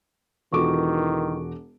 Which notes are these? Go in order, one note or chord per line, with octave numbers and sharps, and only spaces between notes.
E1 D#3 E3 F4 F#4 A4 C#6 D6